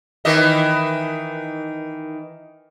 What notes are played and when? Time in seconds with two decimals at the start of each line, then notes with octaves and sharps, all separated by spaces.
0.25 D#3 E3 D#5